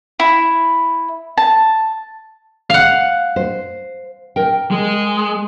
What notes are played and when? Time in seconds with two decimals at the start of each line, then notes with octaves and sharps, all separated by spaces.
0.20 E4
1.37 A5
2.70 F5 F#5
3.36 C5
4.36 A#4 G5
4.71 G#3